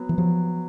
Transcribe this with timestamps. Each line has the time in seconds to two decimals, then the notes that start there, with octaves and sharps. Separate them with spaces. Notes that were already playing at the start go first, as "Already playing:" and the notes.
Already playing: F#3 B3
0.09 E3
0.18 F3 F#3